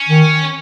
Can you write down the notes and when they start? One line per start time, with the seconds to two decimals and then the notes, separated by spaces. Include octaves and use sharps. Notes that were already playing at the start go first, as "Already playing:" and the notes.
Already playing: C#4
0.09 D#3